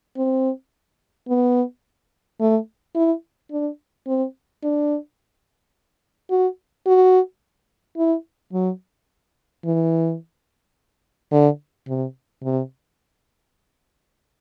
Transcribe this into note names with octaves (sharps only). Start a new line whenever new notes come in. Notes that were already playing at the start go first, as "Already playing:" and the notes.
C4
B3
A3
E4
D4
C4
D4
F#4
F#4
E4
F#3
E3
D3
C3
C3